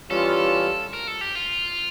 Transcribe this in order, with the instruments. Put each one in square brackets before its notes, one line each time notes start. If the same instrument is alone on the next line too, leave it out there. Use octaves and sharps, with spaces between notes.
[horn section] E3 G3 C#4 F4 [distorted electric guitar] A4
[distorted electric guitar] A#4
A4
G4
F4